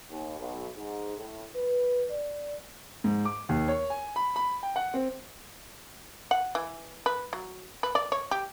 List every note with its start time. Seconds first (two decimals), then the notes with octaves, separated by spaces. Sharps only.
0.10 D#2
0.39 B1
0.76 G#2
1.17 A2
1.56 B4
2.10 D5
3.04 G#2
3.25 D6
3.49 D#2
3.68 C#5
3.90 G#5
4.16 B5
4.36 B5
4.63 G5
4.76 F#5
4.94 C4
6.31 F#5
6.55 E3
7.06 B4
7.33 F#3
7.83 B4
7.95 D5
8.12 C#5
8.31 G4